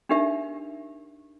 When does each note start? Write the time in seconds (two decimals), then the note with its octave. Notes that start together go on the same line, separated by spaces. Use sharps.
0.09 D4 D#4 G4 A#4 E5